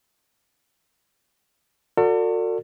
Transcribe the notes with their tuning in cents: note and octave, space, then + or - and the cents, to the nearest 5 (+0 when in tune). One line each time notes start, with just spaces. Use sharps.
F#4 -30 A4 +40 D5 +0